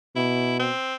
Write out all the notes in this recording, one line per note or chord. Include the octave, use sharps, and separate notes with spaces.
B2 E4
C4